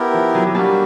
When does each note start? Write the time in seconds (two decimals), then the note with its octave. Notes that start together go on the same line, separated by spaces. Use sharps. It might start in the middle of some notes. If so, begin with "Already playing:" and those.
Already playing: B3 E4 G4 A#4
0.14 F3
0.35 F#3
0.47 F#3
0.55 G3 A#3 D4 F#4